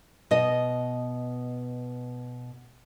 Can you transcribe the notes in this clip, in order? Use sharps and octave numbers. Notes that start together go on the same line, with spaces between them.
B2 D#5